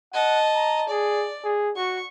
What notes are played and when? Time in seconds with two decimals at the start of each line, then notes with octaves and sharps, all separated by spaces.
0.13 D#5 F#5 A5
0.55 A#5
0.89 G#4 D5
1.44 G#4
1.76 F#4 C#6